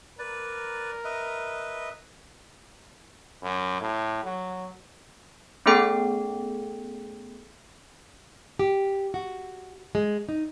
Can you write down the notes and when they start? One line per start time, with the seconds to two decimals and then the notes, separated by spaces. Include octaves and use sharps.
0.19 A#4 B4 D5
1.04 B4 D#5 E5
3.43 F#2
3.81 A2
4.24 F#3
5.66 A3 B3 C#4 G#4 A4 G5
8.59 G4
9.14 F#4
9.95 G#3
10.29 D#4